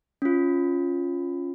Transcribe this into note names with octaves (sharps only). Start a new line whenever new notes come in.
C#4 F4